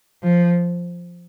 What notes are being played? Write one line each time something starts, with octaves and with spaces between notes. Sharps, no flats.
F3